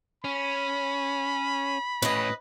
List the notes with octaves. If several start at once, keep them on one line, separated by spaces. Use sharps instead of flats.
C#4 B5
A2 C#4 B4 D#5